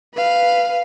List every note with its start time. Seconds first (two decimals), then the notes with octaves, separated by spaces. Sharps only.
0.15 B4 F5